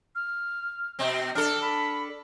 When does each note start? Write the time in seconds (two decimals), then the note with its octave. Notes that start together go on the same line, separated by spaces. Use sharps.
0.15 F6
0.99 B2 C4
1.35 D4 A4 F6
1.62 B5